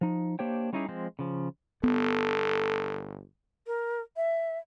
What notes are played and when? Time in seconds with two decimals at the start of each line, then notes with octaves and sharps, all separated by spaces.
0.01 F3 D#4
0.39 A#3 D4 G4 C5 C#5 G5
0.73 G3 C#4 D#4 E4 G4 G#4
0.89 F3 G#3 C4
1.19 C#3 F3
1.83 G1 B3 A4
3.67 A#4
4.17 E5